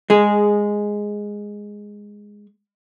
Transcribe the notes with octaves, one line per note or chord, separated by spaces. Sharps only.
G#3 G#4